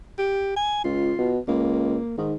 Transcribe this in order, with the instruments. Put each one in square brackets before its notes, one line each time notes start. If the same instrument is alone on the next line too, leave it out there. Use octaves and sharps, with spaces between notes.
[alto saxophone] G4
G#5
[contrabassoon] C#2 [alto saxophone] F4
[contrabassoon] B2
[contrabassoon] C#2 [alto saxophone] A#3
[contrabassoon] G#2 [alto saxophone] D#3